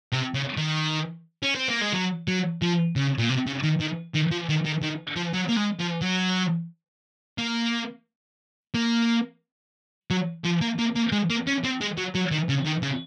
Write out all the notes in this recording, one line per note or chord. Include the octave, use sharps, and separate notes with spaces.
C3
C#3
D#3
C#4
C4
A#3
G#3
F#3
F#3
F3
C#3
A#2
C3
C#3
D#3
D#3
D#3
F3
D#3
D#3
D#3
F3
F#3
A#3
G#3
F3
F#3
A#3
A#3
F#3
F3
A#3
A#3
A#3
G#3
A#3
C#4
C4
G#3
F#3
F#3
D#3
C#3
D#3
C#3